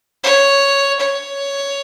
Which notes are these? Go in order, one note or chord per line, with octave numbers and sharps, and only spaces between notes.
C#5
C#5